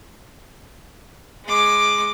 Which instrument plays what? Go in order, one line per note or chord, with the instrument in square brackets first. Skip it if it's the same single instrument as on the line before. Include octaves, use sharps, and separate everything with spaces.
[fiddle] G#3 D6